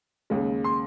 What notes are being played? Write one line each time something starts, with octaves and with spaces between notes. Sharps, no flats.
D#2 C#3 G#3
C6